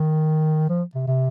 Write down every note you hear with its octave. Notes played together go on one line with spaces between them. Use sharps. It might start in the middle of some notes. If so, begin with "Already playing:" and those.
Already playing: D#3
F3
C3
C3